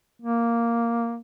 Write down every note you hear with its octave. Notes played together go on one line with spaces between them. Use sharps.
A#3